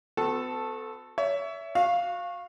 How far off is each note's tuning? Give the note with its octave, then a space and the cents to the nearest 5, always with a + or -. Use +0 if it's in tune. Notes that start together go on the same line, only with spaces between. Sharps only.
B3 +45 F#4 -30 A4 +0
C#5 +35 E5 +10
F#4 -20 F5 +5